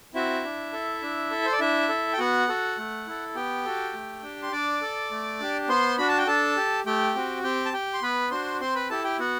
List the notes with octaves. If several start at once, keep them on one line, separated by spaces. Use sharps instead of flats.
C4 E4 F#4 E5
D4
A4
D4
A4
C5
D5
D4 E4 E5
A4
G5
B3 F#4 F#5
F#4 A4
A3
E4 A4
B3 G4 G5
F#4 A4
A3
D4 G4
C6
D4 D5 D6
A4
A3
D4 G4
B3 C5 C6
D4 F#4 B5
A5
G5
D4 A4 A5
G4
A3 G4 G5
C4 F#4
C4 G4 G5
A5
G4 G5
C6
B3 B4 B5
D4 F#4 C5 C6
C4 C5 C6
B4 B5
E4 G4 A4 A5
G4 G5
B3 F#4 F#5